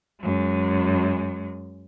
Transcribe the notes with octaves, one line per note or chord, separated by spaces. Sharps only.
F#2 G#3